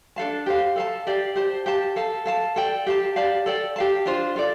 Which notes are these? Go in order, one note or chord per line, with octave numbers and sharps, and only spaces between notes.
D4 A4 F5 A5
G4 C5 F5
A4 F5 A5
G4 D5 F5
G4 C5 A5
G4 F5 A5
A4 F5 A5
A4 F5 A5
A4 D5 G5
G4 F5 A5
G4 D5 F5 A5
A4 D5 G5
G4 F5 A5
D4 F4 C5
F4 A4 D5